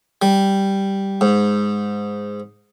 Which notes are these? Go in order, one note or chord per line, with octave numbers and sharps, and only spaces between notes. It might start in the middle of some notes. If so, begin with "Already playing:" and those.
G3
G#2